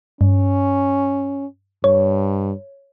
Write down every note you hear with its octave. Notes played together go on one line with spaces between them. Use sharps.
G2 C#4
G2 C#5